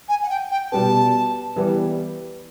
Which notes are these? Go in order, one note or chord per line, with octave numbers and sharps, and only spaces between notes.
G#5
F#5
G5
G5
B2 G3 B3 A5
E3 G3 B3